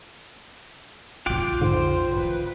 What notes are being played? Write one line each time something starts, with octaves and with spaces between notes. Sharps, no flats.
B1 F2 F4 G5 D6 F#6
G#2 D3 C5
C#3 E3 B4